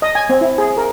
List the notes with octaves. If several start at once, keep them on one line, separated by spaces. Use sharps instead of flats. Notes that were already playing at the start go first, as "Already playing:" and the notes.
D#5
G#5
C4
E4
G#4
A#4